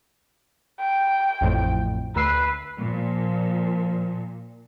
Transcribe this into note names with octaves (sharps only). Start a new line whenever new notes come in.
G5
A1 F2 A2
D2 B4 E6 C7
A#2 F3